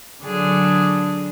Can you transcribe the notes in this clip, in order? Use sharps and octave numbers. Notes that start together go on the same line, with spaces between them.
D3 F#3 D4 G#4